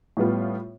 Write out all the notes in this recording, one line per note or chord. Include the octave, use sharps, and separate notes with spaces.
A2 G3 B3 F4